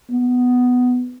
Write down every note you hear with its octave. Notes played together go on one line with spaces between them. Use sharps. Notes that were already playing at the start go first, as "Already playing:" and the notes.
B3